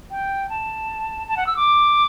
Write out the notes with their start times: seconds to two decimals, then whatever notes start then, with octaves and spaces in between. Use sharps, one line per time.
0.11 G5
0.49 A5
1.28 A5
1.37 F#5
1.47 E6
1.57 D6